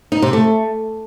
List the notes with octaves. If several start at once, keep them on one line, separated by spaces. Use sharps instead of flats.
D#4
C3
A3